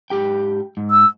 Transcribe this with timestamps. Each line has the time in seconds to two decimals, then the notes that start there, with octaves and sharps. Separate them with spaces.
0.10 G#2 G4 G5
0.77 G#2
0.90 E6